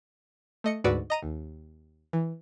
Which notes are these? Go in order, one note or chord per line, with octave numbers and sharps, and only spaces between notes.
A3 D#5 C#7
D2 G#2 F#4 B4 D5 E6
D#5 A#5 D#7
D#2
E3